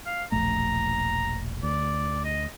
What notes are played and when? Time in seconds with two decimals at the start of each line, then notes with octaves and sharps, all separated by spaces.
0.06 F5
0.32 E1 A#1 A3 A#5
1.63 D2 D5
2.25 D#5